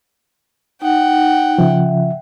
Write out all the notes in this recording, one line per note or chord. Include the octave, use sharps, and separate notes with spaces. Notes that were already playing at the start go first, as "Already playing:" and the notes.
D#4 F#5 G5
C#3 F3 E5